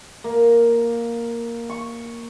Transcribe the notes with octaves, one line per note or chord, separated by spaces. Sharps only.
A#3
C#6